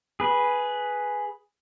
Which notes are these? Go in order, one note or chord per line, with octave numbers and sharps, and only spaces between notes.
G#4 B4